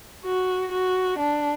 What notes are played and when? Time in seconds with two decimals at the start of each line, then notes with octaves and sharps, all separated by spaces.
0.25 F#4
0.72 F#4
1.19 D4